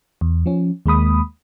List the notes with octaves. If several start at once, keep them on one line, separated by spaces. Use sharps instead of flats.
E2
F3 C#4
D#2 G#3 A#3 B5 D#6